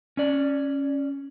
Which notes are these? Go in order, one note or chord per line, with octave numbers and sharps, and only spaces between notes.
C#4 D5